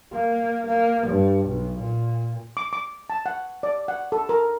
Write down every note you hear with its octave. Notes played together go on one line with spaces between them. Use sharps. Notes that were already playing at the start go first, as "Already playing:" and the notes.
A#3
A#3
G2
B1
A#2
D6
D6
A5
F#5
D5
F#5
A4
A#4